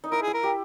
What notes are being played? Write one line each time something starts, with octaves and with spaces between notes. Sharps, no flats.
D#4
E4 A#4
G#4
E4
A#4
G4